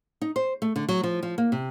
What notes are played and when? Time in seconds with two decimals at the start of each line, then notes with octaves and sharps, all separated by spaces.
0.22 D#4
0.36 C5
0.62 A3
0.76 D3
0.89 F#3
1.03 F3
1.23 F3
1.38 A#3
1.52 C3